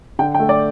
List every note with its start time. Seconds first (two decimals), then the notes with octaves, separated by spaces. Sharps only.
0.19 D3 G5
0.35 G5
0.39 A3
0.49 D5